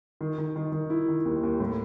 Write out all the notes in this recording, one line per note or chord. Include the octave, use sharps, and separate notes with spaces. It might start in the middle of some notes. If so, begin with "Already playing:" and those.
D#3
D#3
D#3
D#3
E4
D#3
D#2
D#2
A2